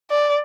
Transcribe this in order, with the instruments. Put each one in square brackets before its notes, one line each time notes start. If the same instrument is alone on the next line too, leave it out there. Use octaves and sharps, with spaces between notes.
[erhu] D5